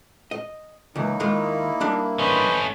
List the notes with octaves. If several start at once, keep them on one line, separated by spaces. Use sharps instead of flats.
D#5
C#2 E3 A#3 D#4 E4
D#2 G#3 F4
G3 D4 B5
A3 C#4 B4 C5 D#5